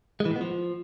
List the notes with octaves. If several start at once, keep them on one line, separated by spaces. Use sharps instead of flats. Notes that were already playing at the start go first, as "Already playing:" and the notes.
G#3
E3
A2
B3
F3